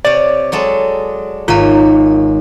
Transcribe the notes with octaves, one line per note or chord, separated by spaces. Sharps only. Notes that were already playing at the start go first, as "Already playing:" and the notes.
C3 C#5 D5
F#3 G#3 A4
G#1 A#3 F4 C#5 A#5